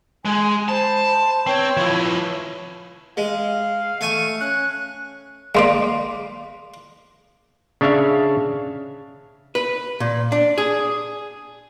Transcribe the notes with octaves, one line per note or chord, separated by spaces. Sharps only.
G#3 G#5 C6
C5 A5 B5
C6
C4 B4 C#5 C#6
F3 E4
G#3 F5
A3 F5 G#5 C#6
C#4 F#6
G#3 A#3 D5 F5 C6
C#3 D4 C#5 E5 F5
B4
A#2
D4
G#4